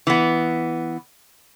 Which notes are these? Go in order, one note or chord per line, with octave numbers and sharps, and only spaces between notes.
E3 B3